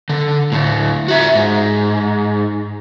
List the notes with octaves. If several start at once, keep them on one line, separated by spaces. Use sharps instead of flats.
D3
D2 A2
F#4 E5
G#2